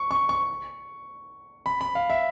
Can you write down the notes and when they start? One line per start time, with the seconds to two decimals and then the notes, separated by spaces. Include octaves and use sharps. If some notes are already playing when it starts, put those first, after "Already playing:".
Already playing: C#6
0.11 C#6
0.29 C#6
1.66 B5
1.81 B5
1.95 F5
2.10 E5